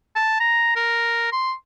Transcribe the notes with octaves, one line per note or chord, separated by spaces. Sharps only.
A5
A#5
A#4
C6